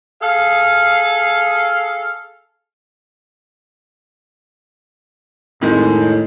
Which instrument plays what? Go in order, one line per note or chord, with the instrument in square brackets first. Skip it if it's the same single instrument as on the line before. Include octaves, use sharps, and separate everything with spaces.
[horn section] G#4 A4 F5
[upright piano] F2 D#3 G#3 [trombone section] A2